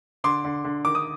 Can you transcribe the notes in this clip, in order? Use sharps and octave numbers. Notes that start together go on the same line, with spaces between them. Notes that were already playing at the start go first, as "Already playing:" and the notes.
D3 C6 D6
D3
D3
D#3 D6
D#6